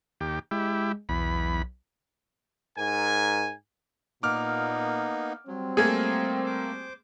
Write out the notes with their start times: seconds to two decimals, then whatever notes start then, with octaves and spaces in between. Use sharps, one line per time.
0.21 D#2 G4
0.51 G#3 E4 G4
1.09 B1 E2 B5
2.78 G#2 A#4 G#5
4.23 A#2 A#3 B3 D#4 D6 F6
5.48 F#3 G3 C4
5.77 A3 A#3 G#4 G#6
6.46 C5 D6